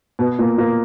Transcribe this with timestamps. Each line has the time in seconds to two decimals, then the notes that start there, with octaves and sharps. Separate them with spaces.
0.19 B2 B3
0.39 A#2 A#3
0.58 A#2 A#3